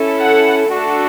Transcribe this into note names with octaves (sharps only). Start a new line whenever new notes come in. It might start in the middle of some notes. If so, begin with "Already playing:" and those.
Already playing: C#4 E4 A4
F#5
A3 D4 F#4 A4